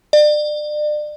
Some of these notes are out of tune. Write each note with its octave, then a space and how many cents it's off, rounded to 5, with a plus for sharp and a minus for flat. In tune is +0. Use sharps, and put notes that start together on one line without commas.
D5 +35